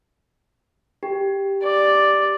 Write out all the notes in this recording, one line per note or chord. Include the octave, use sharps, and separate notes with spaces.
G4
D5